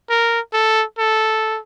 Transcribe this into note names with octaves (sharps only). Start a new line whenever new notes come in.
A#4
A4
A4